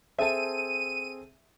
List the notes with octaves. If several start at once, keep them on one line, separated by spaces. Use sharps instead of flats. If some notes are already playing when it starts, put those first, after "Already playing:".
C4 G#4 A4 E5 A5 D#7